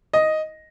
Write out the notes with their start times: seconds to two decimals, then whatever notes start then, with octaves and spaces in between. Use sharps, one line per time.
0.13 D#5